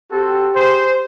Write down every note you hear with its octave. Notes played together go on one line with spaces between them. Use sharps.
C4 F#4 G4 A4
G#4 C5